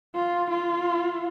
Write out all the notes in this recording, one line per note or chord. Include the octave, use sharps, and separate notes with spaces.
F4
F4